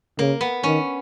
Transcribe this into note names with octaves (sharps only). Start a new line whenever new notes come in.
C#3 A#3
B3
D#3 C#4